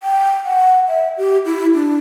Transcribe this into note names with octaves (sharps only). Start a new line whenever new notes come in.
G5
F#5
E5
G4
E4
D4